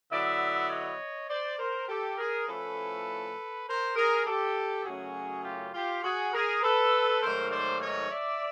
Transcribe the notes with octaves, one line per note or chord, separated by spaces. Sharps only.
D3 F#3 B3 E4 D5 E5
C#5 D#5
C5 D5
A#4 C5
G4 A4
G#4 A#4
A2 F3 A3 C#4 E4 A4 B4
A#4 C5
G#4 A#4
G4 A4
F#2 C#3 F#3 A3 C#4 F#4 G#4
F4 G4
F4 G4
F#4 G#4
G#4 A#4
A4 B4
G#2 D#3 F#3 A3 A#4 C5
C5 D5
C#5 D#5
D5 E5